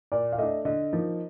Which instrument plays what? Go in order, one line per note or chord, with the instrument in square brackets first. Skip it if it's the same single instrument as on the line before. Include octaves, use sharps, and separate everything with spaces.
[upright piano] A#2 [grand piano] D5
[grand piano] F5
[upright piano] A3 D4 [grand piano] D#5
[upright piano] D3 [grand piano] D#5
[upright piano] F3 A#3 D#4